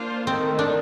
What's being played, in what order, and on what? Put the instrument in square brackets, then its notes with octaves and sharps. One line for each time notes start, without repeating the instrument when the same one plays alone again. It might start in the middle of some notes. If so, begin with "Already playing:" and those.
Already playing: [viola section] A#3 D4 F4 C5
[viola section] D#3 A3 D#4 A4 [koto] C4
[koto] D4